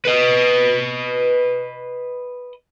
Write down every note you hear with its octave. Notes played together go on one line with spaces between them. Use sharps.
B4 D#5